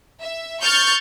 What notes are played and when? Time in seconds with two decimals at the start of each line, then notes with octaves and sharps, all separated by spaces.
0.21 E5
0.62 C#6 F6 G6 A6